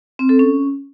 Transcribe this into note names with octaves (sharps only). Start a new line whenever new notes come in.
C4
A4
C#4